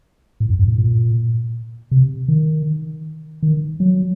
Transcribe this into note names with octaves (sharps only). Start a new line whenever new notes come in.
A2
F#2
G2
A2
A#2
C3
D#3
D#3
F#3